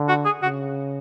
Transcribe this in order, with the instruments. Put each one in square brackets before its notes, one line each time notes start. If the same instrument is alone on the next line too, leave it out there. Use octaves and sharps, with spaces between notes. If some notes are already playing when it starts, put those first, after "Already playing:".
Already playing: [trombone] D3
[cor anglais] F#4
G#4
[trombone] C#3 [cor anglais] F#4